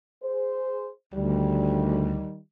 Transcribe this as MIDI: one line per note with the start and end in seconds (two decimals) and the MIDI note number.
0.23 0.90 68
0.23 0.90 72
1.14 2.25 38
1.14 2.39 51
1.14 2.39 55